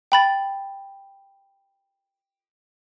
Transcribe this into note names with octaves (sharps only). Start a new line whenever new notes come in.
G5 B5 A6